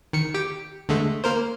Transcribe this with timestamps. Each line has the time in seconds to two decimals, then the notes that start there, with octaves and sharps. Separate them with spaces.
0.13 D#3 C#7
0.34 G4 G5
0.89 D3 G#3 A3
1.24 A#3 A#4 C5